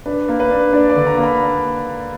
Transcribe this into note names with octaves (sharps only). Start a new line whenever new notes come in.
D4 B4
A#3
B4
D4
D4 D5
D5
D3
A#5
A#3
B5